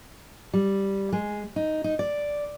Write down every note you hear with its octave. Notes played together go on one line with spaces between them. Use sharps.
G3
G#3
D#4
D#4
D5